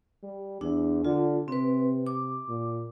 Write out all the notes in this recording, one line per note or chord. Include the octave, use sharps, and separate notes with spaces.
G3
E2 D4
D3 F4
C3 C4 B4
D6
A#2